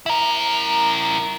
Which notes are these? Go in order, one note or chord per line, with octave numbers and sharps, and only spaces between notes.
E4 A#4